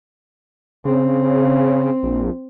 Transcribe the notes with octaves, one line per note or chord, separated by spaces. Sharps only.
C#3 C4
A#1